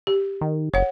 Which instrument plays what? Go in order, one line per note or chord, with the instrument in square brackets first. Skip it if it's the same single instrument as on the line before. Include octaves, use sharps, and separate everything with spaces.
[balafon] G4
[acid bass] D#3
[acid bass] F#1 [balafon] C#5 F#5